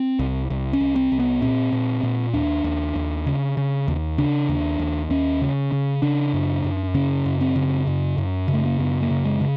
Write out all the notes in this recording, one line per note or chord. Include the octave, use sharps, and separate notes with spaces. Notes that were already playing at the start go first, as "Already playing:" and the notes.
Already playing: C4
C2
C2
C#4
C2
C4
C2
B3
A#2 C4
A#2
A#2
D#2 D4
D#2
D#2
C#3
C#3
D#2
C#3 D4
D#2
D#2
D#2 C#4
C#3
C#3
C#3 D4
F#2
F#2
C#3 C#4
F#2
C4
C#3
F#2
F#2
C#3
A3
A#3
F#2 B3
A#3
C#3
G#3
C#3